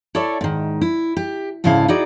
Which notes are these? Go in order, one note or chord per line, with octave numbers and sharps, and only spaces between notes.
E4 A4 C#5 D5 E5
G#2 D#3
E4
G4
D2 G#2 C#3 E4 A4 F5
D#4 E4 F#4 G#4 D5